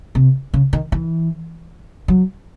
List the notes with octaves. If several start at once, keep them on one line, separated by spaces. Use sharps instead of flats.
C3
C#3
D#3
E3
F#3